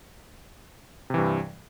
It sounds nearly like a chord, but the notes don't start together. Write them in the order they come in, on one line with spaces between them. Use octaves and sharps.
C3 E3 G2